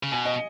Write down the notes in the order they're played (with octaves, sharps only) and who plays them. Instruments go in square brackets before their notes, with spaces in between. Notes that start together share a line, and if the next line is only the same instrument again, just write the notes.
[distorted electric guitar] C#3
[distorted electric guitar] B2 [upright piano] G#5
[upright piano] D#5